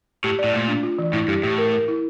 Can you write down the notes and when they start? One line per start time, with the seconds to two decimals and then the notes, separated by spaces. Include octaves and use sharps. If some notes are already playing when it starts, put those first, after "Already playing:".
0.24 A2 G4
0.39 D5
0.44 A2
0.54 A#2 A3
0.68 D4
0.83 F4
0.98 E3
1.13 A2 E4
1.28 G2 G4
1.43 A2 G4
1.58 A#4
1.73 A#4
1.88 E4